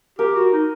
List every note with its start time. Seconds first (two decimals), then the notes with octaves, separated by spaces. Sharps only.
0.19 G4 A#4
0.35 F#4
0.52 D#4